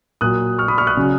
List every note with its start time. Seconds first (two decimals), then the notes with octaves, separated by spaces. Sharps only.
0.21 A#2 F#3 D#6 F#6
0.58 C#6 F6
0.68 B5 D#6
0.78 C#6 F6
0.87 D#6 F#6
0.97 C#3 F#3